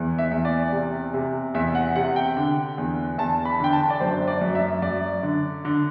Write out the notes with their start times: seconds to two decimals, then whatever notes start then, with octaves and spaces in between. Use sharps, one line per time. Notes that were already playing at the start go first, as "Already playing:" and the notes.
Already playing: E2 E3
0.18 E5
0.31 E2
0.45 D5
0.72 C3
1.14 C3
1.54 E2 E5
1.75 F#5
1.96 C3 F#5
2.16 G5
2.37 D3
2.78 E2
3.18 E2 A5
3.45 B5
3.60 D3 G5
3.73 A5
3.90 D5
4.00 F#2 C5
4.27 D5
4.41 F#2
4.55 E5
4.82 F#2 D5
5.23 D3
5.65 D3